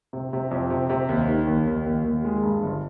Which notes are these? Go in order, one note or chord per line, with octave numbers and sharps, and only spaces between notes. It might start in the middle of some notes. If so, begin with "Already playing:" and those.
C3
C3
F2
C3
C3
D#2
D#3
D#2
D#2
D#2
D#2
G#3
G2
G1